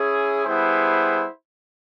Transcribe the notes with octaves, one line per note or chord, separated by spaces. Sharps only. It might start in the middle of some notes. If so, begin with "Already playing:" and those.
Already playing: C#4 E4 G#4
G3 B3 E4 G#4 C5